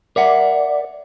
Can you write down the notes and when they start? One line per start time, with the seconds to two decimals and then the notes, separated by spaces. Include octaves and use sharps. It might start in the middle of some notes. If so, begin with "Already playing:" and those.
0.16 A#4 D5 E5 F#5